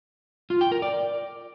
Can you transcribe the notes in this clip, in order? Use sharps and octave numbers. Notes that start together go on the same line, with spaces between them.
F4
G5
A#4
D5